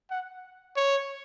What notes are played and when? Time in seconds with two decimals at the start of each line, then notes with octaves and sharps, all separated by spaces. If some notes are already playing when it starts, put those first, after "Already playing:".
0.11 F#5
0.77 C#5